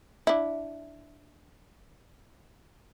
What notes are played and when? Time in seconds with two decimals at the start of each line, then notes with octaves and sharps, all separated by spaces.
0.27 D4 E4